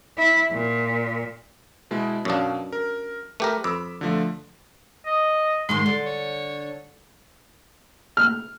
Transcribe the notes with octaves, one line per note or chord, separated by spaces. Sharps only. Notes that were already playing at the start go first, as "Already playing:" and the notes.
E4
A#2
B2 G#3 E4
F#2 B2 F#3 D4 F5
A#4
A3 G4 A#4 B4
F2 B5 D6 E6
D3 F3 A3
D#5
G#2 D#3 G#3 C6
D3
C#5
F6